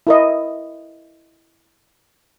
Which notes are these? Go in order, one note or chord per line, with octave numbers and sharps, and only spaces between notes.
E4 A#4 D#5